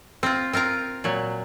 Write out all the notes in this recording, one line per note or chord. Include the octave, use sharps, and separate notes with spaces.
C4 F4
C4 F4 A#4 A#5
A#2 F#3